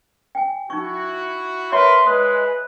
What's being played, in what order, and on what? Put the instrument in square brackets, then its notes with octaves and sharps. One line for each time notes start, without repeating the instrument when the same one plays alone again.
[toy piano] G5 G#5
[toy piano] D#4 C#6 [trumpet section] E4 F#4
[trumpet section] A#4 B4 [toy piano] C#5 E5 [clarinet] C6
[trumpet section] G#3 [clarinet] B4 [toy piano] D#6